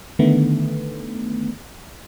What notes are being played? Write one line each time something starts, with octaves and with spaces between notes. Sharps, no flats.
D3 D#3 A3 B3